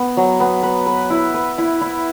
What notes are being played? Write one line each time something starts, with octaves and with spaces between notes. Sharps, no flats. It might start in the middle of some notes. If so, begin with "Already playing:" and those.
Already playing: B3
F#3
B3
B4
B4
E4
B4
E4
E4